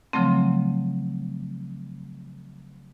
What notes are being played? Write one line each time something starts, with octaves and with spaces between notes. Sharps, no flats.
C#3 F3 F#3 A3 C4